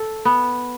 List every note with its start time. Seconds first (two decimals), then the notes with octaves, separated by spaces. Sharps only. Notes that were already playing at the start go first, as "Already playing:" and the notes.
Already playing: A4
0.25 B3